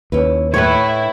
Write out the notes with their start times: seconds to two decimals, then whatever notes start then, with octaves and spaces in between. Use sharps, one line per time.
0.12 D#2 C#4 E4 B4
0.54 A2 A3 E4 B4 C#5